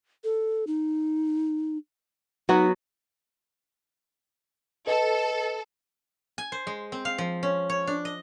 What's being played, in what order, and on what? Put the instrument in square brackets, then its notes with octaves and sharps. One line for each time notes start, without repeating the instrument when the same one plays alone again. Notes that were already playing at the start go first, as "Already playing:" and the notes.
[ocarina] A4
D#4
[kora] F#3 B3 F#4 [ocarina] D#4
[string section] A4 [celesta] B4 D#5
[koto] G#5
C5
G#3
C4
F5
F3
C#4
C#5
D4
D#5